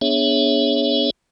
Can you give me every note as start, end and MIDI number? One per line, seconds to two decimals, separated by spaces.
0.01 1.10 59
0.01 1.10 62
0.01 1.10 68
0.01 1.10 73
0.01 1.10 76